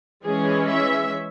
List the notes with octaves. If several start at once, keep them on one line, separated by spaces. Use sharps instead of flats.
E3 G#3 C#4 G#4
E5